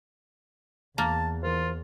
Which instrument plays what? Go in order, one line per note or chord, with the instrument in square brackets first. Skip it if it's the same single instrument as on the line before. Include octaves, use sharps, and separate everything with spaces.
[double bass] E2 [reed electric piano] E3 [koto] A#3 [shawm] A5
[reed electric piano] E3 A#4 C5 [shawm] F4